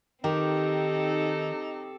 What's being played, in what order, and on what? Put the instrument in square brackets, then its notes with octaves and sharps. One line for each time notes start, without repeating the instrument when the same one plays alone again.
[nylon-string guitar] D#3 [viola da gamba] C4 A4 [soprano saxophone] D#4 [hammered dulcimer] G4